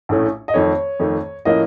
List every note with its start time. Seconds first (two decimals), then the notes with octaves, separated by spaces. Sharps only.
0.09 A#1 A2 A3 C#4
0.48 D#5
0.54 F2 D#3 A3 C#5
1.00 F2 D#3 A3
1.45 A2 F3 A#3 C#4 D#5